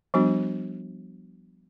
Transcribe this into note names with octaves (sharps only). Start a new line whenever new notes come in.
F3 G3 B3 D4 F#4